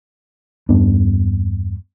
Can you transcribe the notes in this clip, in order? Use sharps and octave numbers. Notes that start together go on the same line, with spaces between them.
E2 G2 B3 D4